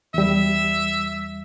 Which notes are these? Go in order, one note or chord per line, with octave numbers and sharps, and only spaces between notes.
E2 G3 E5